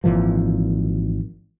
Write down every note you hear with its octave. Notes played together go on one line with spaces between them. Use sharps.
G#1 A#2 E3 F3